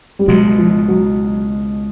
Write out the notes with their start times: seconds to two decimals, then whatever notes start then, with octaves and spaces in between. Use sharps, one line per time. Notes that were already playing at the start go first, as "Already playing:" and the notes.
0.19 G3
0.27 C#2 B2 F#3 G#3
0.58 F3
0.88 F#3